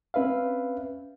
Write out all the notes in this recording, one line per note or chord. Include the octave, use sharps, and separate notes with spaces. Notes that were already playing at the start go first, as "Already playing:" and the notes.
C4 C#4 B4 E5 F5